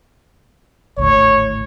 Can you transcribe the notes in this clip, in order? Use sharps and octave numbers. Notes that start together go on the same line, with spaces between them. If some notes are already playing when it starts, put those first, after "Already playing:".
G#1 D2 A2 C#5